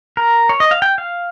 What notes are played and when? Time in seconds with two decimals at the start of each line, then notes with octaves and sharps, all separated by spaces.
0.17 A#4
0.49 C#5
0.60 D#5
0.71 F5
0.82 G5
0.98 F5